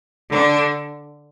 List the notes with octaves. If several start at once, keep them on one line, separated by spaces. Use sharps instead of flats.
D3 D4